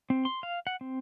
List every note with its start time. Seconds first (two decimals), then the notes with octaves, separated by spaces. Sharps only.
0.10 C4
0.25 C6
0.43 F5
0.67 F#5
0.81 C4